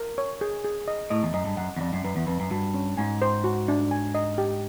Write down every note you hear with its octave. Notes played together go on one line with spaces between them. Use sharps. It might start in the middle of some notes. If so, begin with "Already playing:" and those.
Already playing: A#4
C#5
G#4
G#4
D#5
A2 D#5
E2
F#2 D#5
G2
F#2 F#5
E2
F2 D5
F#2
F#2 B4
E2
F2 B4
F#2
G2 F#4
C#4
G#2 G#5
C5
F#4
D4
G#5
D#5
G4